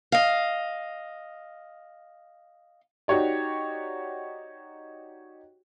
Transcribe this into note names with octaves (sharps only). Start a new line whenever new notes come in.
D#5 F5
D#4 F#4 G4 C#5 D5